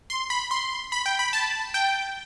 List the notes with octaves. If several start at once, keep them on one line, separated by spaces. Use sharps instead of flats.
C6
B5
C6
B5
G5
B5
A5
G5